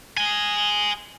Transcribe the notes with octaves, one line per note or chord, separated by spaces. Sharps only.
D#5 G#5